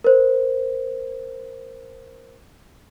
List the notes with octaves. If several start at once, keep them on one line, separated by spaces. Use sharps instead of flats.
A#4 C5